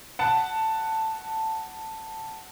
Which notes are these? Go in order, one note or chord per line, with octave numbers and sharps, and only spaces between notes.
F#5 A5